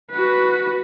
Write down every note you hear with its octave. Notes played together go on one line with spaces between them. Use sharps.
F#4 B4